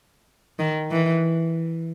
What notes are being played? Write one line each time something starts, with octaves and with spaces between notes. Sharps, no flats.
D#3
E3